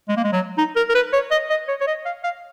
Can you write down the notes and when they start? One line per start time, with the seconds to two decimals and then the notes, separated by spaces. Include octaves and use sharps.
0.08 G#3
0.17 A#3
0.24 G#3
0.32 F#3
0.58 D#4
0.76 A#4
0.89 A#4
0.95 B4
1.13 C#5
1.31 D#5
1.50 D#5
1.68 C#5
1.81 C#5
1.87 D#5
2.05 F5
2.24 F5